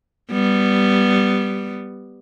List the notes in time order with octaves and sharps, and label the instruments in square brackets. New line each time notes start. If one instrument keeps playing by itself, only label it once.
[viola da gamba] G3 B3